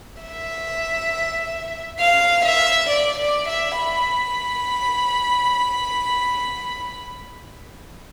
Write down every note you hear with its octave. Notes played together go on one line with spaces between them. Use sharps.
E5
F5
E5
D5
D5
E5
B5